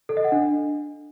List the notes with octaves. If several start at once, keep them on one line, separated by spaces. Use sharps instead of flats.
A4
D#5
F#5
D4